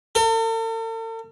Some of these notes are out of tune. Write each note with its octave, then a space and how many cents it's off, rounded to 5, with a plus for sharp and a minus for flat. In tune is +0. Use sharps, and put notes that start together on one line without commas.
A4 +45